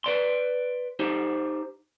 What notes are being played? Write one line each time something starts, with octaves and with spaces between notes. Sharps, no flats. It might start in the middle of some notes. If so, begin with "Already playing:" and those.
B4 D5 C6
D#4 G4 C5